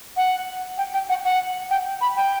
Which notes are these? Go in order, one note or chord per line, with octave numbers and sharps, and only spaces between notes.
F#5
G5
G5
F#5
F#5
G5
B5
G5